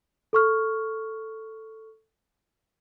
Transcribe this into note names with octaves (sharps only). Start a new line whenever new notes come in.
A4 C#6 F6